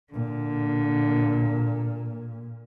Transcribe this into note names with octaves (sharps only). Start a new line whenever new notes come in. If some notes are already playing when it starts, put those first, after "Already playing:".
A#2 D3